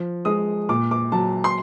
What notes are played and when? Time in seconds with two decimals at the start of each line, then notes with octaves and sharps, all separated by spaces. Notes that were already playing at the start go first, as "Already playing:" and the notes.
Already playing: F3
0.25 G#3 D#6
0.69 A#2 D6
0.91 D6
1.12 F#3 A5
1.44 C6